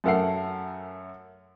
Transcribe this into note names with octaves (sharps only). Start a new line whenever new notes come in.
F#2 A3 A4 A#4 F#5 C7